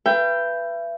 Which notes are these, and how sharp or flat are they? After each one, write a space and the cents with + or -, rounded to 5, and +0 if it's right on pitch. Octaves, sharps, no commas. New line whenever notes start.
B4 +0 E5 +40 G5 +0